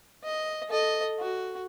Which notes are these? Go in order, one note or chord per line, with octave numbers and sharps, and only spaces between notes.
D#5
A4 D#5
F#4